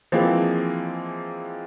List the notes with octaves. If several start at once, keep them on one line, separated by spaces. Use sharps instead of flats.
E3 F3 G#3 A#3 C4